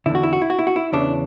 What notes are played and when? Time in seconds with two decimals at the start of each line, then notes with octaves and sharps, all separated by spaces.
0.06 E2 D3 E4
0.15 F#4
0.23 E4
0.33 F#4
0.42 E4
0.50 F#4
0.59 E4
0.67 F#4
0.76 E4
0.92 E2 C#3 E3 D4